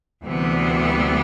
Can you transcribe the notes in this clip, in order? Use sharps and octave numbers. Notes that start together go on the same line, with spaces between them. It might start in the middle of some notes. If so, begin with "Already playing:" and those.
D2 C3 E3 G3 B3